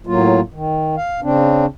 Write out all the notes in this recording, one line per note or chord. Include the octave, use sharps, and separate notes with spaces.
A2 F#3 A#3 F4
D#3
F5
C#3 C4 D4